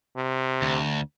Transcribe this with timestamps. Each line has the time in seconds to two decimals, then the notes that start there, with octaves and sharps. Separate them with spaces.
0.16 C3
0.62 D2